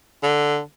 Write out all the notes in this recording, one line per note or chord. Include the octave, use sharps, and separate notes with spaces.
D3